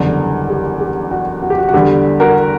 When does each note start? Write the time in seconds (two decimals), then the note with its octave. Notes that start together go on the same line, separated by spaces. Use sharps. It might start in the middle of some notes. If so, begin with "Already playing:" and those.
Already playing: F#1 E2 D3 G3
0.50 G4
0.81 G4
1.11 F#4
1.42 F#4
1.50 G4
1.58 F#4
1.69 F#4
1.74 E2 D3 G3 G4
2.20 F#4 A#4